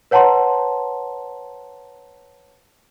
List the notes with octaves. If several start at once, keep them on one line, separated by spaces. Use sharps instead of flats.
B4 C#5 F#5 A5 A#5 C6